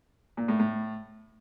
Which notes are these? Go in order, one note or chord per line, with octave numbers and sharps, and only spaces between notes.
A#2
A2
A2